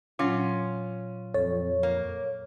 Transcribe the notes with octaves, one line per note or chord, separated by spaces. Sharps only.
A#2 F#3 C#4 F4
F2 A4 C#5
A#3